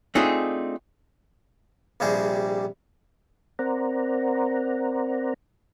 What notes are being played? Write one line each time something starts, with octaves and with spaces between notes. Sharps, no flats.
A3 C4 D4 D#4 F4 G#4
A#1 G2 C3 G3 G#4 C5
C4 A#4 C5 D5 F#5 A#5